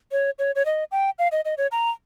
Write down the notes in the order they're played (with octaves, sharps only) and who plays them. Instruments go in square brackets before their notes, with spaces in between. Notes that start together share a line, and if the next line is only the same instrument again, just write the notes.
[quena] C#5
C#5
C#5
D#5
G5
F5
D#5
D#5
C#5
A#5